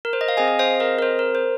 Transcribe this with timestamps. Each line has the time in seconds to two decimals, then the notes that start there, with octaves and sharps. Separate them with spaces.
0.05 A#4
0.13 C5
0.21 D#5
0.28 F5
0.37 C4 G#4 D#5 G#5
0.48 D#5
0.59 C5 F5
0.80 A#4 D#5
0.99 A#4
1.02 C5
1.19 A#4
1.35 C5